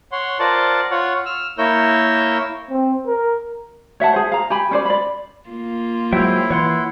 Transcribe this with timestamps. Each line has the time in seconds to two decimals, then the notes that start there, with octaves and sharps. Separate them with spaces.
0.12 C#5 F#5 C6
0.40 F4 A#4 C5 D5 F#5 A5
0.91 F4 C#5 F#5
1.26 E6 F6
1.58 A#3 E4 A#4 C#5 E6 G6
2.70 C4
3.07 A#4
4.00 C#5 E5 F#5 A5
4.13 G#4 C5
4.32 F5 A#5
4.50 G4 G#5 B5
4.71 C#4 C5 D5
4.85 D5 B5
5.49 A#3 F4
6.13 F#3 G#3 E4 C5 E5 G5
6.50 E3 C#5 F#5 C6